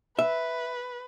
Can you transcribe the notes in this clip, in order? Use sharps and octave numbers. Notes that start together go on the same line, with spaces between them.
B4 E5